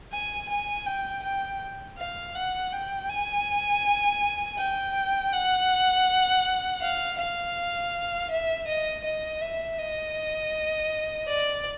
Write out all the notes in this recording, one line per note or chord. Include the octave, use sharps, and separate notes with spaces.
G#5
G#5
G5
G5
F5
F#5
G5
G#5
G5
F#5
F5
F5
E5
D#5
D#5
E5
D#5
D5